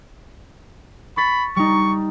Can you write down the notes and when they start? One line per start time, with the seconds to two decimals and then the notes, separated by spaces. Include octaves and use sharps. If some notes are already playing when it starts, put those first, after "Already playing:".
1.17 B5 C#6 A6 B6
1.56 G3 D#4 C#6